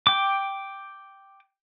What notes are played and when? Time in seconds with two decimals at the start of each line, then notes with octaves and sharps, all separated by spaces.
0.07 G5 D6